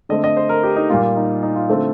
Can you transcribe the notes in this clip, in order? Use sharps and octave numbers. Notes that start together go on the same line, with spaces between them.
D3 A3 C4 D#5
D#5
C5
A#4
G4
D#4
A#2 G3 A#3 F4
F4
D#4
D#4
F4
D3 A3 C4